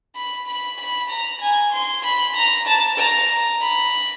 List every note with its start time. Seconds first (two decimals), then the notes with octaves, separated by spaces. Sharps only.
0.15 B5
0.47 B5
0.79 B5
1.10 A#5
1.41 G#5
1.73 C6
2.03 B5
2.35 A#5
2.67 A5
2.98 A#5
3.61 B5